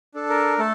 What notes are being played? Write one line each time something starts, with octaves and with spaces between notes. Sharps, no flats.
D4 A4
A#4
A3 A4